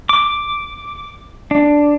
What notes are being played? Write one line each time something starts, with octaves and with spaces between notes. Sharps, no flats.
D6
D4